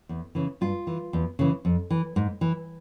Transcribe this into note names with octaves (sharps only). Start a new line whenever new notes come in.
E2
C#3 E3
G2 F4
E3
E2
C#3 E3
F2
E3
G#2
E3